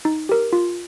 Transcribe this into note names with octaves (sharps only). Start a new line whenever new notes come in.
D#4
G4 A#4
F4